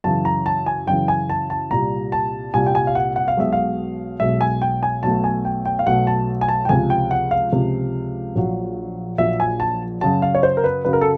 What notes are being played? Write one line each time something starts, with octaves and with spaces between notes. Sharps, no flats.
F#2 C#3 E3 A5
A#5
A5
G#5
F#2 C#3 E3 G5
G#5
A5
A5
C2 A#2 G3 A#5
A5
C2 A#2 G3 G#5
G5
G#5
F5
F#5
F#5
F5
B1 B2 G#3 E5
F5
B1 B2 G#3 E5
G#5
G5
G#5
B1 B2 F#3 A3 A5
G#5
G5
G5
F5
B1 B2 F#3 A3 F#5
A5
G#5
A5
G5
C#2 C3 F3 G#5
G5
F#5
F5
C#2 C3 F3
A#1 A#2 F#3
A#1 A#2 F#3 E5
G#5
A5
F#2 C#3 F#3 A5
F5
C#5
C5
A#4
B4
F#2 C#3 F#3 B4
A#4
A4